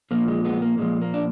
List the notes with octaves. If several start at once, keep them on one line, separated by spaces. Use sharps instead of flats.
A#2 F3 A#3
G#3
G#3 B3
A#3
A#2 F3 G#3
A#3
D4